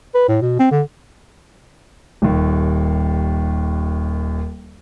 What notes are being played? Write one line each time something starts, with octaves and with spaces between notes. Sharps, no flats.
B4
A2
B2
C4
D3
D#1 D#2